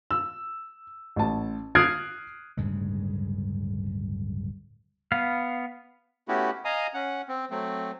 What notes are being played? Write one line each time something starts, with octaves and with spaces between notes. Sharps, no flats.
E6
A1 A5
D#6 F6 F#6 G#6 C7 D7
D1 G2 C#3 G#3
B3 F5
A3 B3 C#4 E4 F#4 G4
D#5 F5 G#5 A#5 D#6
C#4 F#5
C4
F#3 A3 C4